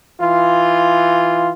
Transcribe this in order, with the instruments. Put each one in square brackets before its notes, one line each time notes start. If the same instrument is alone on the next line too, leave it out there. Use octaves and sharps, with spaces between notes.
[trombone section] E3 F4